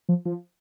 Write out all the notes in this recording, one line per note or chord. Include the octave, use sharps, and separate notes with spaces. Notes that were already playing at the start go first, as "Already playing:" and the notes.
F3
F3